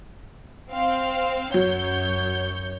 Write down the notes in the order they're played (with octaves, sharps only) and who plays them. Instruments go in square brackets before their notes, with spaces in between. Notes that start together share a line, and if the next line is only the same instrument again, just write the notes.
[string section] C4 F5
[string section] F#2 C#5 G6 [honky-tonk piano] F#3